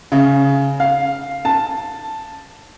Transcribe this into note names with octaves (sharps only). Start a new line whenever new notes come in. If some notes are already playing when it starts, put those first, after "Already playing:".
C#3
F5
A5